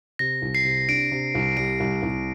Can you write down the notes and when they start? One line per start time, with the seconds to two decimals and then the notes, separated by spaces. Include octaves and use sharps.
0.19 C3 A#6
0.42 C2
0.55 C7
0.65 C3
0.88 D4 D7
1.11 C3
1.35 C2
1.57 G3 D7
1.80 C2
2.03 C2